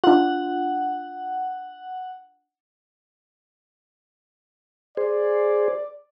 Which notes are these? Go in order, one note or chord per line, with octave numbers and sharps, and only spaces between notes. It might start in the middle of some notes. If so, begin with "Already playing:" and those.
D4 F4 F#5
G#4 C5 D5